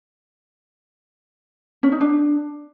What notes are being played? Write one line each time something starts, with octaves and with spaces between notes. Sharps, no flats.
C#4
D#4
D4